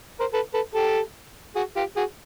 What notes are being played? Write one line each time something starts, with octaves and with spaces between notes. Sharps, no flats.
A#4 C5
A4 B4
A4 B4
G4 A4
F#4 G#4
F4 G4
F#4 G#4